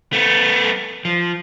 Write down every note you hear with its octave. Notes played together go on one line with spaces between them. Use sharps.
A3 B3
F3